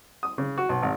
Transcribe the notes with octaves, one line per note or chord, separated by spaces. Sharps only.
D#6
C#3
F#4
B1
G#1